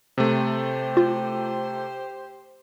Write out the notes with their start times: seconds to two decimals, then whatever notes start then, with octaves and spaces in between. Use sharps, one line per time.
0.18 C3 A3 G4 C5
0.97 F4